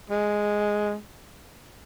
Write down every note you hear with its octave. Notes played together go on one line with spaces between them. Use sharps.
G#3